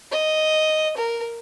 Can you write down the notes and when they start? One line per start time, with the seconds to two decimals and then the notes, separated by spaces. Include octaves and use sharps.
0.12 D#5
0.97 A#4